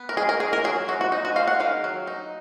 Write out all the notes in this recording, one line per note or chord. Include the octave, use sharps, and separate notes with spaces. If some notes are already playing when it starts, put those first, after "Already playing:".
Already playing: B3
A#4
G#3 G#4
A#4
D#3 G#4
A#4
F#3 G#4
F#3 F#4
F#4
D#4
F#4
G#3 F5
F#5
D#3 F5
F#3
D#4